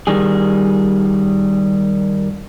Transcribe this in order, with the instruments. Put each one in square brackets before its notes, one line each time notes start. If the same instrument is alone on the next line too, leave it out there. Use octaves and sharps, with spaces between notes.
[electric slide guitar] D#3 G3 G#4